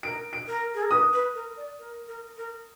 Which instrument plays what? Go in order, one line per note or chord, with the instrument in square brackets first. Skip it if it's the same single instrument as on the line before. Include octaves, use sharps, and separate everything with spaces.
[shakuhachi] A#4 [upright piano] D7
[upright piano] D7
[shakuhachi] A#4
G#4
A#4
[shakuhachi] B4 [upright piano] D#6
[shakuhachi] B4
A#4
D5
A#4
A#4
A#4